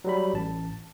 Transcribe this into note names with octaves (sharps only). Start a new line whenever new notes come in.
F#3 G3 B5
A1 A5